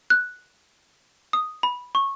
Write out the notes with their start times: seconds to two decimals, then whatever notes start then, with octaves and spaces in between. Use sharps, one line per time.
0.10 F#6
1.33 D#6
1.63 B5
1.95 C#6